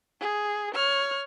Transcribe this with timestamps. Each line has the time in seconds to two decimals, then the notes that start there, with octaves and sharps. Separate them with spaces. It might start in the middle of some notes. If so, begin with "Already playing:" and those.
0.20 G#4
0.74 C#5 F6